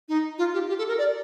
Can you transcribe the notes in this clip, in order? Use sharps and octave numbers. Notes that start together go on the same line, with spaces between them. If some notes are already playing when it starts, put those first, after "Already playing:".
D#4
F4
G4
G4
A4
A#4
D5